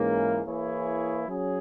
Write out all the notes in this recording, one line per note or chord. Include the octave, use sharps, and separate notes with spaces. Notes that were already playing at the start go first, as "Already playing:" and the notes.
Already playing: G#2 E3 A#3 C#4
E3 A#3 E4 G#4 C#5
F#3 C#4 G#4